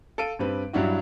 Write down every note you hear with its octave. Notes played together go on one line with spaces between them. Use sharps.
A4 F5 D7 D#7
G2 G3 C4 B4
G2 F#3 G3 D4 E4 F#4